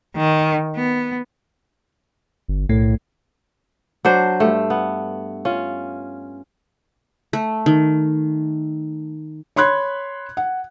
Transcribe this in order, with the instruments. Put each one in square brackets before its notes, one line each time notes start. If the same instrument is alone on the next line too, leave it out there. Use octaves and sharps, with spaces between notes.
[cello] D#3
B3
[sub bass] G1
[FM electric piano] B1 A3 [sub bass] A2
[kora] F#3 D4 C5
G2 A3
B3
C#4 F4
[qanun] A3
D#3
[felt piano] C#5 B5 C6 F#6 G#6
F#5